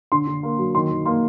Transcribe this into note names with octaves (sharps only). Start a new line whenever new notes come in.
D3 C6
D3
A#3
F#3
D#3 C6
D#3
A#3 C6